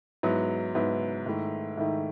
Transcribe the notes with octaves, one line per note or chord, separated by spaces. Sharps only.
G#2 F#3 B3 E4
G#2 F#3 B3 E4
G#2 D#3 A3 E4
G#2 D#3 A3 E4